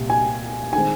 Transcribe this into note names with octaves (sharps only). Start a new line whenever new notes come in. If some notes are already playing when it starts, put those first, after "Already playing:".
Already playing: C2 A#2 G3
G#5
D#3 G#3 C4 G#5